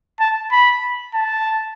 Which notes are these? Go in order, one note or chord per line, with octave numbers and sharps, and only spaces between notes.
A5
B5
A5